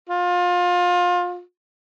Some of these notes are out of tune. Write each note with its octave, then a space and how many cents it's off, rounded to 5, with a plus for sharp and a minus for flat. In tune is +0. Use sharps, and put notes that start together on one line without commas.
F4 +25